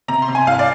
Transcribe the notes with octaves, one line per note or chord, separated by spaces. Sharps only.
C3 A#5
C6
C3
G#5
C2 F5
D5